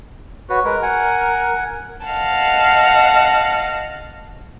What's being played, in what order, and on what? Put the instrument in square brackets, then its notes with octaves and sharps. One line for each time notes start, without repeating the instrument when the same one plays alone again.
[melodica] F#4 B4 [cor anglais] C#5
[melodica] G#3 B4 [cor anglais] A#4
[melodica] F#5 G#5
[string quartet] D#5 F5 F#5 A5